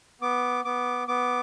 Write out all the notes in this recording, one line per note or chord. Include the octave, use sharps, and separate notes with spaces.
B3 D6
B3 D6
B3 D6